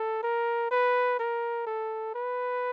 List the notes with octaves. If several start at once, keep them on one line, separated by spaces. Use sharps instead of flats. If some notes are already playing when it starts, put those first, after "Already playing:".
Already playing: A4
A#4
B4
A#4
A4
B4